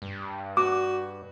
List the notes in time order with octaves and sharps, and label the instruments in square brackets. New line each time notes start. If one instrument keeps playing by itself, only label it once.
[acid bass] G2
[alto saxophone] F#4 [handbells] D6